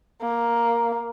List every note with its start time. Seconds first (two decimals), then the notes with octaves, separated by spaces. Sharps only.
0.22 A#3